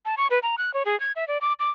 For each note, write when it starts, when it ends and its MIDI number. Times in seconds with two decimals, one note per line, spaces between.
0.05 0.15 81
0.17 0.27 85
0.31 0.39 71
0.43 0.56 82
0.58 0.73 90
0.74 0.83 73
0.85 0.98 68
1.00 1.12 92
1.16 1.27 76
1.28 1.38 74
1.41 1.53 86
1.60 1.71 86